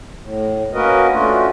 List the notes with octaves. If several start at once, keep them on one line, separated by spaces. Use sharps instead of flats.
A2
A#3 C#4 F#4 A#4 B4 D#5
A3 C#4 D4 F4 F#4